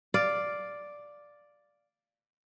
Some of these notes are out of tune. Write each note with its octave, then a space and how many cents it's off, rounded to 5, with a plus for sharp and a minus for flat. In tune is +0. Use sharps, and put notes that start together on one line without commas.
D5 +0 F5 +0